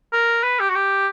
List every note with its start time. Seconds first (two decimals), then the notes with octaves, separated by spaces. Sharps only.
0.13 A#4
0.43 B4
0.60 G4
0.69 F#4
0.75 G4